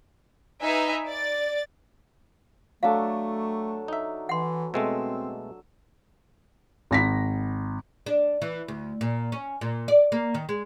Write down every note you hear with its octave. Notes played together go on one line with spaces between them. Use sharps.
D#4 B4 E5 G#5
D5 A6
F#3 A3 D4 A4 F5
D#4 E5
E3 F#5 C6
B2 G#3 A3 C4 E6
G#1 A#6 B6
D4
E3
D2
A#2
C#4
A#2
D5
A#3
D#3
G#3